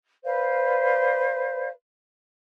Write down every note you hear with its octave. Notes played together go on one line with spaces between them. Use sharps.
B4 C5 D5 F5